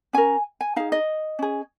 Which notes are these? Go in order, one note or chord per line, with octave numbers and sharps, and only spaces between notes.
C#4 A#4 G#5
G#5
D#4 G#4 F5
D#5
C#4 G#4